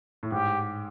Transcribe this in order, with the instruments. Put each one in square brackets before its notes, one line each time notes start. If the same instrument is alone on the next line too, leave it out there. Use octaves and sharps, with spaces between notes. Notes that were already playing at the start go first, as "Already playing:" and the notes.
[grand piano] A2
[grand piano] G#2 [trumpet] G4